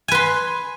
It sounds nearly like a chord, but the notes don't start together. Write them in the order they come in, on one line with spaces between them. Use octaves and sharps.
G#5 B4 C6